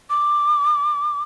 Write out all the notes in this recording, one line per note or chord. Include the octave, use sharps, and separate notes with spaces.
D6